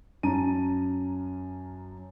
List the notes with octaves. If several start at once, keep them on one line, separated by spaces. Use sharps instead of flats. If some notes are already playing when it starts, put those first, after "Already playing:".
F#2 C#4 A5 A#5 D#7